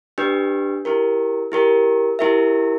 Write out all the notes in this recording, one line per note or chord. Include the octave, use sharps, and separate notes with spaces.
D4 G4 B4
E4 G4 A#4
E4 G4 A#4
E4 G4 A#4 E5